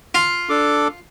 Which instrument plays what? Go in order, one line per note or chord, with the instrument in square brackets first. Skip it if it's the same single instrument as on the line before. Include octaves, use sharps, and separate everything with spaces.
[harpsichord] F4
[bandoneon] D4 A4 D6